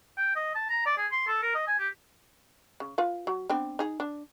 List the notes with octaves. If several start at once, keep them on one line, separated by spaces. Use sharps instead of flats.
G5
D#5
A5
A#5
D5
G#4
C6
A4
A#4
D#5
G#5
G4
C#3
F4 B4 F5
F#3
B3 C4 D4
D#4 G#4
D4